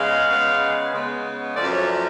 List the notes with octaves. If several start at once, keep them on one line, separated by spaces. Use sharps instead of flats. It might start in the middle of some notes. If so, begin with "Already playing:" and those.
Already playing: C#3 G#3 B3 F5
C#3 G#3 B3
C#3 G#3 B3
F#2 F3 A3 D5
C#5
D5